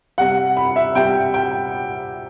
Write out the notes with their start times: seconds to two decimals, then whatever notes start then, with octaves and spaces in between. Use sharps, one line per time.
0.18 C3 G3 F#5
0.57 B5
0.76 E5
0.95 C3 G3 G5
1.34 G5